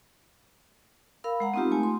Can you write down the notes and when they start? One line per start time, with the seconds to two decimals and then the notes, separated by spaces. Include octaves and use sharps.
1.24 A#4 F5 B5 E6
1.40 G#3 F#5 A#5
1.54 B3 C4 D#4 F4 G4
1.71 A3 G#5
1.83 C6